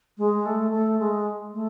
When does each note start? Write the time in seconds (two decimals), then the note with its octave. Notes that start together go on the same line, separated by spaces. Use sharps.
0.18 G#3
0.46 A3
0.72 A3
0.99 G#3
1.53 A3